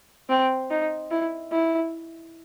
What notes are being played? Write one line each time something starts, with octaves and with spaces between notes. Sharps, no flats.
C4
D#4
E4
E4